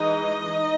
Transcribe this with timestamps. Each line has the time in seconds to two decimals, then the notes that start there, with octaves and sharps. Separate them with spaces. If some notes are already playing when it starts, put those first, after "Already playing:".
Already playing: E3 G#3 D#4 D#5
0.47 D#4